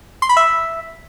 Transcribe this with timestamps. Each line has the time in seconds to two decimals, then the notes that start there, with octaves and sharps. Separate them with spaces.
0.22 C6
0.29 B5
0.37 E5